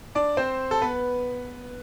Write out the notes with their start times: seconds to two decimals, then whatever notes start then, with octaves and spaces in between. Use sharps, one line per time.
0.15 D4 D5
0.37 C4 C5
0.71 A4
0.82 B3 B4